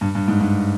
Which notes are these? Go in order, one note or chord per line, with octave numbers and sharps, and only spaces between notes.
G2
G2
G#2
G2